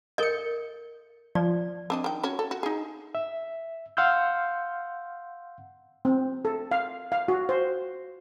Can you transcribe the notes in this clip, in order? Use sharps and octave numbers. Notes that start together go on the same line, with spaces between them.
A4 A#4 D#5 G6 C#7
F3 D5
C4 D4 D#5
D#3 G5
C#4 F#4 C#5
A4
F#4
D#4 G#4
E5
F5 F#5 C6 E6 F6 G6
C4
A4
F5
F5
F#4
C5